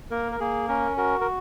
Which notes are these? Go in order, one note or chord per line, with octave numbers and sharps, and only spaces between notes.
A#3 A#4
A#4
A#3 G#4
C#4 A#4
F#4 A#4
A#4